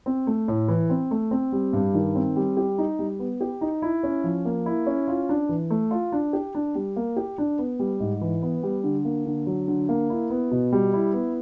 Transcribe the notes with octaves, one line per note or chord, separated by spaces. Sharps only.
C4
A3
A2
E3
C4
A3
C4
G3
G2
D#3
C4
G3
G4
D#4
G3
B3
G4
D#4
E4
C#4
F3
A#3
E4
C#4
F4
D4
E3
A3
F4
D4
G4
D4
G3
A#3
G4
D4
B3
G3
G#2
E3
B3
G3
D3
A#3
D3
F#3
D3
A#3
E4
B3
B2
G3
E4
B3